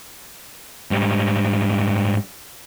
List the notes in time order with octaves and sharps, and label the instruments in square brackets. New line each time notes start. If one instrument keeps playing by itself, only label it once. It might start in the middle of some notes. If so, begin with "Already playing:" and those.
[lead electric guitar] G#2 G3